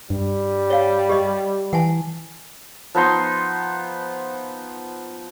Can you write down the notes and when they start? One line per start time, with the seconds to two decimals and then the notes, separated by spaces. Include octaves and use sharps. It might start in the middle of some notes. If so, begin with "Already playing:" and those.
0.10 G2 G3
0.70 C#5 F5
1.09 G4 D#5
1.73 E3 F#5 G#5 A5
2.95 F3 B3 D#4 C6